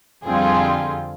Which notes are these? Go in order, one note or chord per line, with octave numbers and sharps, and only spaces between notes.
F2 D3 G3 C4 F4 G#4